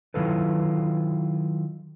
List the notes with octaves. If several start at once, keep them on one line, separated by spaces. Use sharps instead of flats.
D#3 F#3 E4 F4 A4 B4